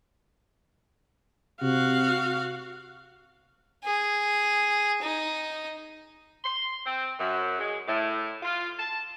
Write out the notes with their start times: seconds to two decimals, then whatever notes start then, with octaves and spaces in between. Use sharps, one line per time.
1.62 C3 F#4 F5
3.84 G#4
5.02 D#4
6.44 C6
6.85 C4
7.19 F#2
7.58 G#3
7.87 A2
8.43 F4
8.78 A5